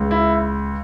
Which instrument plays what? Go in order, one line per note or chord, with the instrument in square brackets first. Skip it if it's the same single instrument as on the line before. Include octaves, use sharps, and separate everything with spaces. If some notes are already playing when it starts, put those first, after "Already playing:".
Already playing: [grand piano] C#2
E4